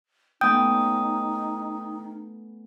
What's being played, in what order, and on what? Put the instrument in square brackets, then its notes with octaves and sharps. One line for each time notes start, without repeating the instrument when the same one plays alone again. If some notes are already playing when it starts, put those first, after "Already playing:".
[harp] A3 B3 C#4 [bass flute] D#4 [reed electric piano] G5 [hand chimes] D#6